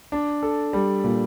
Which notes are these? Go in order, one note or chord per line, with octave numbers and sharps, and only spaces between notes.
D4
A4
G3
A#2